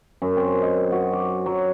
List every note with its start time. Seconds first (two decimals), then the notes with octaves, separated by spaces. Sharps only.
0.22 F#2
0.37 C4
0.62 D#5
0.92 F#4
1.13 D6
1.46 F#3